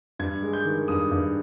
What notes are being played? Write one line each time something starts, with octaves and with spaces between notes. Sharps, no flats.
G2 G#6
G#3
G6
D#3
G2 D#6
G2